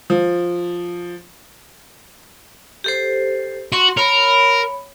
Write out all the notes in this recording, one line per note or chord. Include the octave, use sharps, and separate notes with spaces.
F3
G4 A4 C5
F#4 C6
A#4 C#5 B5